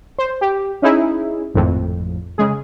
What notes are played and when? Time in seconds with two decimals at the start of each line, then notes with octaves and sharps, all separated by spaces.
0.18 C5
0.41 G4
0.82 C#4 D#4 E4 G#4
1.54 G#1 F2 A2
2.38 C#3 G#3 G#4